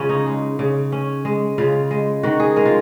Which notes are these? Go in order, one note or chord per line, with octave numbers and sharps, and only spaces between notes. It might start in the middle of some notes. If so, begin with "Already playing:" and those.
Already playing: C#3 G#3 C#4 F4
D#4
G#3
C#3
C#4
G#3
C#3 F4
G#3
D#3 F#4
G#4
G#3 A#4
F4